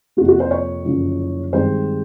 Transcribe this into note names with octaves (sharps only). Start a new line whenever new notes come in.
F2 C3 F3 A#3 F#4
F#4
C5
C#5
F#1 F#2 D3 F3
G2 D#3 G#3 C4 C5